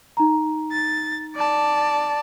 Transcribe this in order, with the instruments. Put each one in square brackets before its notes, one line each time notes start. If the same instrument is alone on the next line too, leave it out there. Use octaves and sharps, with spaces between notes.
[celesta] D#4 A#5
[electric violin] A6
D5 A5